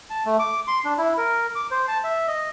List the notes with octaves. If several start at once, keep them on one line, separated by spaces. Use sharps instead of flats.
A5
A3
D6
C6
D4
E4
A#4
D6
C5
A5
E5
D#5